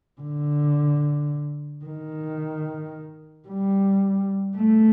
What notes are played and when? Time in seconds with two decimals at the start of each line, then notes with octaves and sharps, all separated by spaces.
0.21 D3
1.86 D#3
3.49 G3
4.57 A3